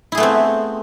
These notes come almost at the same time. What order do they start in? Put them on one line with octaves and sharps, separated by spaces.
E4 G#4 A3 B3 C4